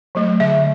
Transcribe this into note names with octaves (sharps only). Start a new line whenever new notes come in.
F#3 A3
D3 E5